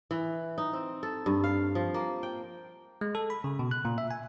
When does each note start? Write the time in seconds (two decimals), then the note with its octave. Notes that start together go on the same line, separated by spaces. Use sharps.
0.11 E3
0.58 D#4
0.73 C4
1.03 A4
1.26 G2
1.44 F5
1.75 F3
1.94 A#3
2.23 G5
3.01 G#3
3.15 A4
3.30 B5
3.44 C#3
3.59 B2
3.71 F#6
3.85 A#2
3.98 E5
4.11 G#5